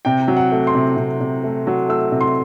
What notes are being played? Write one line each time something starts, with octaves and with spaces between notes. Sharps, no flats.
C3 G5
F#3
F#5
A3
C6
C3
C3
C3
A3
F#3
A3 E6
C3
C6